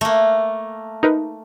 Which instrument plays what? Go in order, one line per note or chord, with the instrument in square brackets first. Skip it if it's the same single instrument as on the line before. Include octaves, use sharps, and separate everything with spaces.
[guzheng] A3 A#3
[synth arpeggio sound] D#4 A#4 B4